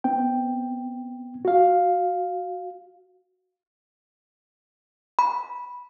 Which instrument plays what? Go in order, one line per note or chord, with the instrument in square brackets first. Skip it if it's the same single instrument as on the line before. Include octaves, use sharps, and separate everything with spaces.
[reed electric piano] B3 C4 G5
F#4 F5
[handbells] B5